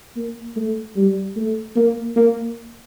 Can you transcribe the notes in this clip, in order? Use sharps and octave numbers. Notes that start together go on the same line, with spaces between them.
A#3
A3
G3
A3
A#3
A#3